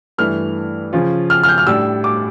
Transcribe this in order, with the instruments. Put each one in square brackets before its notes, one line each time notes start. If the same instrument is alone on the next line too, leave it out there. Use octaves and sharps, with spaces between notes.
[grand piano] G2 E3 A3 E4 [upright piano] F6
[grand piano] C#3 F3 C#4 F4
[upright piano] F6
F6
G6
F6
[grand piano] A2 G3 D4 [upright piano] E6
[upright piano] D6